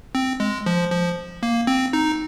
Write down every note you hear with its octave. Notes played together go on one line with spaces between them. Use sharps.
C4
G#3
F3
F3
A#3
C4
D#4